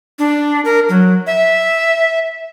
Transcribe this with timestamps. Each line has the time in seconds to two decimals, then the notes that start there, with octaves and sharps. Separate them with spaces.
0.19 D4
0.65 A#4
0.89 F#3
1.27 E5